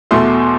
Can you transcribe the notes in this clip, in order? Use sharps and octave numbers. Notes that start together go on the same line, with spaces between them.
E2 B2 A3 C6